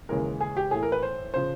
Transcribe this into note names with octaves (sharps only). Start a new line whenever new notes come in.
D#2 C#3 E3 G#3 A#4
G#4
G4
A2 E3 A3 G#4
A#4
B4
C5
C#3 F3 C5